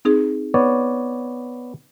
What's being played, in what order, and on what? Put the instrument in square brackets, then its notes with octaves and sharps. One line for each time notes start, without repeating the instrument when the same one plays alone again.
[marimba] C4 D#4 G#4
[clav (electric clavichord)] B3 C#5 D5